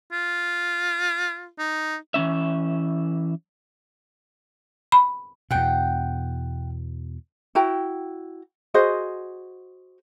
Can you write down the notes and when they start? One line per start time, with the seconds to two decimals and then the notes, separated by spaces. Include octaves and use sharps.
0.12 F4
1.59 D#4
2.14 E3 G3 C#4 E5
4.92 B5
5.51 E2 B2 F#5 G5
7.55 E4 F#4 G5 A#5
8.74 F#4 G#4 C5 D#5